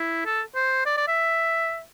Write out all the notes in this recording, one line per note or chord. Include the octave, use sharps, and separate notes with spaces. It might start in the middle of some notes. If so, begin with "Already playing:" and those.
Already playing: E4
A4
C5
D5
D5
E5